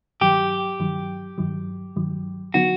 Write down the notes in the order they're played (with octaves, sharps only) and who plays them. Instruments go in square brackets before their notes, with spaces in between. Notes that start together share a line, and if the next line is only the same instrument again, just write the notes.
[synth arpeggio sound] G2 D#3 F#3 [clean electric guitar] G4
[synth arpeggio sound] G2 D#3 F#3
G2 D#3 F#3
G2 D#3 F#3
[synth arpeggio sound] D3 F#3 B3 D#4 [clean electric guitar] F#4